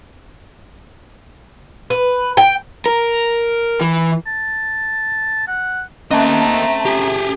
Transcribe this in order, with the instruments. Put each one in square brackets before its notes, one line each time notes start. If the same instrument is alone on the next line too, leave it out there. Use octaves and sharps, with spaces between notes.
[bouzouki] B4
G5
[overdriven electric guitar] A#4
E3
[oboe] A5
F#5
[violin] A3 C4 [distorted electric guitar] A#3 D#5 [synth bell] C#4 E5 A5 [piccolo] A#5
[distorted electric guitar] G4 G#4